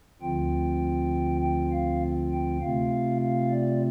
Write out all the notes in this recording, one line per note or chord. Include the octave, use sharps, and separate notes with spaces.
D2 D3 F3 C4 F4 G5
G5
F5
G5
C3 A3 C4 F4 F5
F5
D5